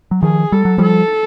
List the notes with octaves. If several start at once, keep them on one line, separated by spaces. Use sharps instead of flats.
F#3
D#3 F3 G#4
G3 A4
F#3
F3 G3 A4